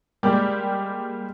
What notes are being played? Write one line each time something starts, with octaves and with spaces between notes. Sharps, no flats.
G3 G#3 A#3 G4 D5